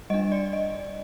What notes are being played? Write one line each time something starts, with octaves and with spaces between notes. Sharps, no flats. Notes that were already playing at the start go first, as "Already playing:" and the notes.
G3 D4 D#5
D5
D#5